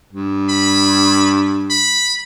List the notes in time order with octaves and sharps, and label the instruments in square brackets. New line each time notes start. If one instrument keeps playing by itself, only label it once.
[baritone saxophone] G2
[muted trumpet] B5
B5